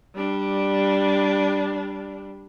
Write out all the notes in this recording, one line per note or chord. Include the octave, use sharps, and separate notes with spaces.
G3 D4